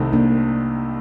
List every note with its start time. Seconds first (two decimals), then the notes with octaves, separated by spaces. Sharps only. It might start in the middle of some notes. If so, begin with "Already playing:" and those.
Already playing: C2 C3 D#3 A3 D#4
0.13 A#3 D4